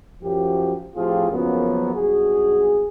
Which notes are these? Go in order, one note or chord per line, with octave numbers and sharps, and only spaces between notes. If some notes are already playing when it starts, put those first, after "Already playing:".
F#2 F3 G4
A2 F3 C4 F4 G4 G#4
C#2 F#2 F3 F#3 A#3 B3
B1 G2 F#4 G#4